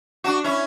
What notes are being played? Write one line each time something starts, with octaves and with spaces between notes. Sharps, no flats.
D4 F#4
C#4 E4